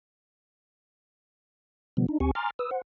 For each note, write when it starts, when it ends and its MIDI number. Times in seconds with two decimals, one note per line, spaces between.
1.97 2.06 47
1.97 2.06 50
1.97 2.06 53
1.97 2.06 55
1.97 2.06 59
2.09 2.18 62
2.09 2.18 63
2.20 2.31 38
2.20 2.31 60
2.20 2.31 67
2.20 2.31 80
2.20 2.31 85
2.35 2.50 80
2.35 2.50 82
2.35 2.50 84
2.35 2.50 86
2.35 2.50 89
2.35 2.50 93
2.59 2.71 71
2.59 2.71 87
2.59 2.71 88
2.71 2.81 72
2.71 2.81 78